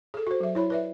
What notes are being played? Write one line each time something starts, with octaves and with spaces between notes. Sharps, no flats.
G#4 A4
F#4 C5
F#3 E5
E4 C#5 B5
B4 D5 E5